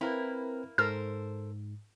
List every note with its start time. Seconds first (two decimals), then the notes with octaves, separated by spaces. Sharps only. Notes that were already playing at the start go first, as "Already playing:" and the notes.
0.01 A#3 C4 E4 A#4 B4
0.78 G#2 A4 A#4 C5 F6